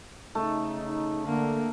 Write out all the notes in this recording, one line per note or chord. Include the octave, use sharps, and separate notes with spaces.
C#3 A3 D#4
D3 A#3